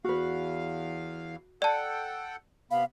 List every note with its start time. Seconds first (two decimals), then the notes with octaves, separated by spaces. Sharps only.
0.04 E2 F#4 B4 F5
1.62 A4 D5 F#5 G5 A5
2.71 C3 B3 F5 B5